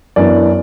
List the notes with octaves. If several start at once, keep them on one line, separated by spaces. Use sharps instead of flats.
F#2 E3 B3 D4 D5